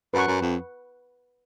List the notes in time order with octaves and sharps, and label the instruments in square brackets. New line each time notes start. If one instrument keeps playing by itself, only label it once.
[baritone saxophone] F#2 [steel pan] B4 F#5 C#6
[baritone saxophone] F#2
F2